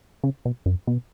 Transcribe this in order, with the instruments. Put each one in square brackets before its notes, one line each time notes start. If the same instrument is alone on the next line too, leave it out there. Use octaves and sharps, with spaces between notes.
[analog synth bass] C#3
B2
F#2
B2